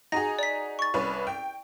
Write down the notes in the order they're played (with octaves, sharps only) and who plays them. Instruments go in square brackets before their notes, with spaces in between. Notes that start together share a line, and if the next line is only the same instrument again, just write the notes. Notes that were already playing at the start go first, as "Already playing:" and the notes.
[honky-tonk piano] D#4 F#4 G#4 [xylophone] A#6
[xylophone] D5 B6
C#6 A6
[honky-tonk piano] C2 C#4 B4
G5